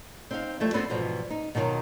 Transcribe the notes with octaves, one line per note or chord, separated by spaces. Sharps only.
C4 D#4 F5
F3 G3 A3 E4
B3 C4 D4 A4 B4
G#2 B2 E3 F3 G3
D#4
B2 D#3 F#3 F4